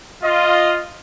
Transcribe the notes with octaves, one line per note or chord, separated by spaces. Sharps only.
F4 D#5